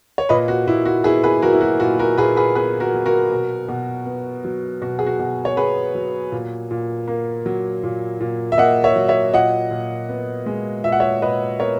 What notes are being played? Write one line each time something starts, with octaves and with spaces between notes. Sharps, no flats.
C#5
A#2 B4 D#5
F#4
A#2 E4
F#4
B3 E4 G#4
G#4 B4
F#3 F#4 A#4
E4
F#4
A#2 F#4
F#4 A#4
A#2 G#4 B4
G#4 B4
B3 G#4 B4
F#4 A#4
F#3
F#4 A#4
B2
B2
B3
F#3
B2 F#4
G#4
F#4
B2
C#5
B3 G#4 B4
F#3
A#2
A#2
A#3
F#3
A#2
A#2
E5
A#3 D#5 F#5
C#5 E5
F#3
C#5 E5
A#2 D#5 F#5
A#2
B3
G#3
A#2 E5
F#5
C#5 E5
A#2 B4 D#5
B3 A#4 C#5